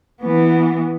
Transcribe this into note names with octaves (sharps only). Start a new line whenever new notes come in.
E3 B3